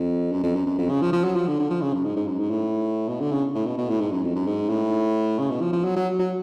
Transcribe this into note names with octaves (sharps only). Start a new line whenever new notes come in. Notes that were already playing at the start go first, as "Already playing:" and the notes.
Already playing: F2
F#2
F2
F#2
F#2
F2
C#3
F3
F3
F#3
F3
D3
D3
F3
C#3
F#2
G#2
G#2
F#2
G#2
A2
B2
D3
C#3
A2
B2
B2
A2
G#2
F#2
F2
F#2
G#2
A2
C#3
B2
F3
F3
F#3
F#3
F#3